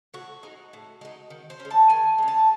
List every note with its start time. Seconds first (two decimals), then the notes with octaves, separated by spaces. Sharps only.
0.14 A2 F#4
0.43 G#3 D#4
0.73 A2
1.01 G#3 D#4
1.30 D#3
1.50 C5
1.60 C#4
1.65 G#3
1.71 A5
1.90 D#3 G#5
2.18 G#3 C#4
2.28 A5